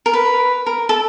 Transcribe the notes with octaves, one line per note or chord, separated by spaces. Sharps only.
A#4
B4
A#4
A4